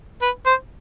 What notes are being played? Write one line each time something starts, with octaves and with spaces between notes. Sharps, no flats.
B4
C5